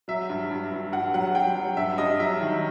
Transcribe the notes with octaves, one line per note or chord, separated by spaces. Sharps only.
F#3 E5
G2
G2
G2
G2 F#5
F#3 F#5
F#3 G5
F#3
G2 E5
G2 D#5
F#3 E5
D#3